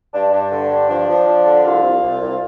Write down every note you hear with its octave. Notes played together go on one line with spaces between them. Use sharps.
G2 D4
G2 D4
D3
G2
F3 D4
F3
F3
D3
C2 F4
C2
C2
C2